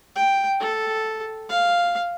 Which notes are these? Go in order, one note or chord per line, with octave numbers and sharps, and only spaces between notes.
G5
A4
F5